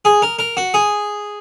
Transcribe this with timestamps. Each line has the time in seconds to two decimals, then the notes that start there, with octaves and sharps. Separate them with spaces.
0.05 G#4
0.22 A#4
0.39 A#4
0.57 F#4
0.74 G#4